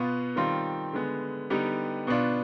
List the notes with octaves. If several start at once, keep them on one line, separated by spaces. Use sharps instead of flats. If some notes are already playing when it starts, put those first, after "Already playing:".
Already playing: B2 B3 F4
D#3 G3 C4 F4
D3 G#3 B3
D3 G3 B3 D#4 G4
B2 B3 D4 F4